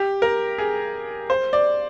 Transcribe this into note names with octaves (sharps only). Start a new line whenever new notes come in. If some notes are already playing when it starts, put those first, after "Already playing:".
Already playing: G4
A#4
G#4
C5
D5